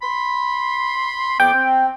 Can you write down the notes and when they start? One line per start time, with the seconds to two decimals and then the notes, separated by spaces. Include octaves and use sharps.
0.02 B5 C6
1.40 F2 B3 G5 D6
1.53 C4